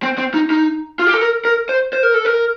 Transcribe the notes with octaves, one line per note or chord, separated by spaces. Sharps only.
C4
C4
D#4
D#4
F4
G4
A4
A#4
A#4
C5
C5
A#4
A4
A#4